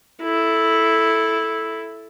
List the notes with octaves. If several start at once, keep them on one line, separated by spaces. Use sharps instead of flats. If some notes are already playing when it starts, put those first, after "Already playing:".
E4 A4